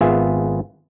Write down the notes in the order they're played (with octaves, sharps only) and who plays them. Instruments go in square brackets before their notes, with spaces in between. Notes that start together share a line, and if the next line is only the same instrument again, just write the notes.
[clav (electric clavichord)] G#1 B3 F4 G#4 E5 G#5